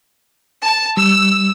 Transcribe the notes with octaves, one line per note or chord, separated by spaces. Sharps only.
A5
G3 E6